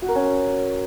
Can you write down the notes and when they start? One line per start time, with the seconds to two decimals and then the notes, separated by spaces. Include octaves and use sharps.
0.02 F#4
0.09 A#4
0.15 C#4